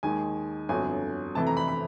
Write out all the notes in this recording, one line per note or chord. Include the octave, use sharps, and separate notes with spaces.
D#2 D#3 G#3 G#5
G1 F2 D3 F#3 G#5
F2 C3 E3 A3 A5
A#5
B5
B5